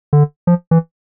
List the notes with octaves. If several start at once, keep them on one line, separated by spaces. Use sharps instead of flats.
D3
F3
E3